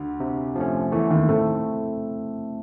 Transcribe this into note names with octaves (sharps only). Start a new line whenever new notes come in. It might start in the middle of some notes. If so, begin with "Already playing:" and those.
Already playing: D2 D3
C3
F3 A3 C#4
E2 E3 A3
D#2 D#3
A2 A3 C4 E4 A4